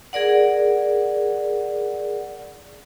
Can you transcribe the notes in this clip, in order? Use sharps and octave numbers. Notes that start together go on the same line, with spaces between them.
G#4 A#4 D5 F#5